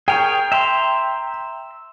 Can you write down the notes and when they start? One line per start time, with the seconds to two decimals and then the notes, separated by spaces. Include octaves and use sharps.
0.08 G#4 A#4 C#5 G5
0.52 E5 A#5 C6